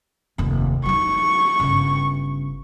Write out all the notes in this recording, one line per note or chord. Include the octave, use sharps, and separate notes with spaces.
F1 D#2
F#3 D#4 C#6
G1 C#3